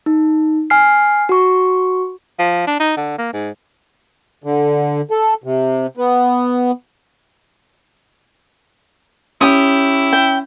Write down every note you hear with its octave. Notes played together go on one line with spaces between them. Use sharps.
D#4
G#5 F6 C7
F#4 C#6
F3
D4
D#4
D3
A#3
G#2
D3
A4
C3
B3
C#4 E4 G4 D#6
G5